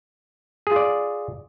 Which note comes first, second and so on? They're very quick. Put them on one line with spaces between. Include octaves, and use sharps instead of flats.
G#4 F4 D5